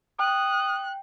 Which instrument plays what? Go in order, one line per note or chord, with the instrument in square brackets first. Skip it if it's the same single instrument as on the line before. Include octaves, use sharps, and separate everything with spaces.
[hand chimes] G5 [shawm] D#6 [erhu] F#6